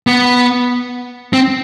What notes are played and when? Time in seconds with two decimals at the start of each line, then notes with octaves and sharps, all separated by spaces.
0.07 B3
1.33 C4